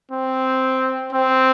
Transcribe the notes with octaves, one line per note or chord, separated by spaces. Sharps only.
C4
C4